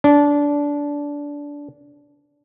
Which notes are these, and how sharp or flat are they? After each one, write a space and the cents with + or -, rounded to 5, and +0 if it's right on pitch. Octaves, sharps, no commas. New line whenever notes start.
D4 -20